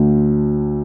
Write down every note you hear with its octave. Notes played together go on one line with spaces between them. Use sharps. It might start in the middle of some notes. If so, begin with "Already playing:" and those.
Already playing: D2 D3 A3